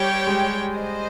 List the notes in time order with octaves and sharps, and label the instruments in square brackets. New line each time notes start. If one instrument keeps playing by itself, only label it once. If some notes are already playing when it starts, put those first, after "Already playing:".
Already playing: [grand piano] G3 [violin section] G4 C#5 G5
[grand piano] G#3
[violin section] C5 D#5